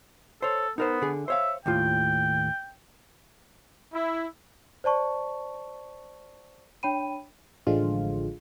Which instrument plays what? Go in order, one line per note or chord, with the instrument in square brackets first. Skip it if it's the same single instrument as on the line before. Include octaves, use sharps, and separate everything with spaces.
[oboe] A4 [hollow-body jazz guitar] C5 C#5
[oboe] B3 [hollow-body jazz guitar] D#4 A#4 C5
[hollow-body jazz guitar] D3 G#4
[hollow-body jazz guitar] C5 C#5 F5 [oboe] E5
[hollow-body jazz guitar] D#2 A2 F4 [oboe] G5
[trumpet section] E4
[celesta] C5 D5 A5 C#6
D4 C#5 G5 B5 D#7
[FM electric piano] A1 D3 F3 G#3 F4